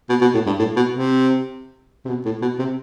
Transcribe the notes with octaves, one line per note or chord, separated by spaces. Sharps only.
B2
B2
A2
G2
A2
B2
C3
C3
B2
A2
B2
C3